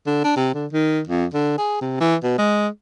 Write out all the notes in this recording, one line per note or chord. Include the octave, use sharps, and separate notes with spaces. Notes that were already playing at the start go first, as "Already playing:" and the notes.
D3
D4
C3
D3
D#3
F2
D3
G#4
C3
E3
B2
G#3